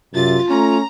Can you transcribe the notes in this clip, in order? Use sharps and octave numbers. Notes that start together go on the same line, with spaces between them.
F#2 C3 F4 A6
A3 C#4 A#5